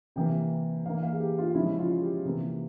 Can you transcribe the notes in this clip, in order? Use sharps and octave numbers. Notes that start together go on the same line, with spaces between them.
C3 E3 A#3 G5
E3 A#3 F5
F5
G#4
G4
F4
C#3 F3 G#3 E4
F4
G4
C3 E3 A#3